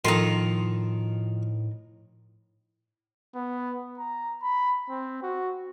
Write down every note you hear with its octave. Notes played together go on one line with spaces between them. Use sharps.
A2 D#3 F3 D#4 A4 C6
B3
A#5
B5
C4
F#4